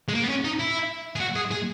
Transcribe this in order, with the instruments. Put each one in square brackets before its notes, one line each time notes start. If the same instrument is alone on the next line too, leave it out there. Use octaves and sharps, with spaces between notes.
[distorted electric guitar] G#3
A#3
B3
C#4
D#4
E4
G#4
F#4
G#4
G#4